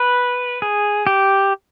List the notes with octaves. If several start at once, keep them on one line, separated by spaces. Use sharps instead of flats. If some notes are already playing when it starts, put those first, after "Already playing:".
Already playing: B4
G#4
G4